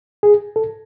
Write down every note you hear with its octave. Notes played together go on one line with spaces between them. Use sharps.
G#4
A4